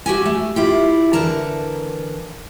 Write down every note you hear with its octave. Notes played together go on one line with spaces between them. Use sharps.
A3 F#4 G4 G#5
A3
E4 F4 G4
D3 E3 A#4 A5 A#5